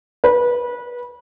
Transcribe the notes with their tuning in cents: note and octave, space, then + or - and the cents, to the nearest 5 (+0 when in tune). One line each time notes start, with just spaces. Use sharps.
B4 -25